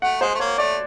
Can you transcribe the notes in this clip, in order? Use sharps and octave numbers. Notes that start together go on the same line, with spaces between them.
A3 F#5
G#3 C5
A3
A#3 C#5
A3 D5